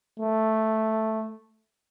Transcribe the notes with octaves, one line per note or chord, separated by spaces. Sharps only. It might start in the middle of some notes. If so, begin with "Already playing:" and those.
A3